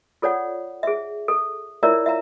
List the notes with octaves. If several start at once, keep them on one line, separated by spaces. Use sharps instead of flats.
F4 A4 C#5 D5 F#5
G#4 E5
A4
E4 F4 A#4 C#5 D5 E5
E5 F5 A#5